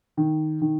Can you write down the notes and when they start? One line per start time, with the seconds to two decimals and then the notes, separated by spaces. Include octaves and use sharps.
0.17 D#3
0.62 D#3